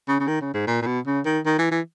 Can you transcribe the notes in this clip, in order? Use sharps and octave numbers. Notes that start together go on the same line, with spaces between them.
C#3
C#3
D#3
C#3
G#2
A#2
A#2
B2
C#3
D#3
D#3
E3
E3